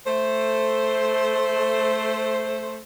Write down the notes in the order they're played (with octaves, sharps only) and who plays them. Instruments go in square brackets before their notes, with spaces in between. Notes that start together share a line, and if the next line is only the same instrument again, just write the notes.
[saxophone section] A3 C5